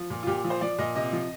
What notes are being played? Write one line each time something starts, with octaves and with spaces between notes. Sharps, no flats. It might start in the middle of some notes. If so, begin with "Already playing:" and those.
Already playing: F3
A#2
F4
A#2 G4
F3
C5
F3 D5
A#2 D#5
C3 D#5
F3